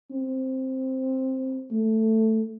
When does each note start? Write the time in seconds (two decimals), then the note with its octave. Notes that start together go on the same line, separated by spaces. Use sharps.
0.11 C4
1.71 A3